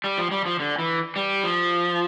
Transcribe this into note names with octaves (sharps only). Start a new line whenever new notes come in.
G3
F3
G3
F3
D3
E3
G3
F3